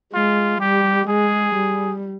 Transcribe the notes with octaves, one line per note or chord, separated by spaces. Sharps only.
G#3 F4
G3 G4
G#3 G#4
G3